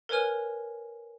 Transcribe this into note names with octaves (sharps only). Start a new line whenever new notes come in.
A#4 B4 C#5 G#5 F6